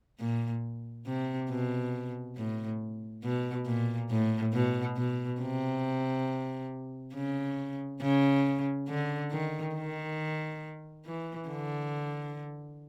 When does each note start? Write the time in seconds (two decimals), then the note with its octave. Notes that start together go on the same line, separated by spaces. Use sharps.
0.20 A#2
1.06 C3
1.50 B2
2.36 A2
3.24 B2
3.66 A#2
4.10 A2
4.53 B2
4.97 B2
5.41 C3
7.14 C#3
8.01 C#3
8.88 D3
9.31 D#3
9.75 D#3
11.06 E3
11.49 D3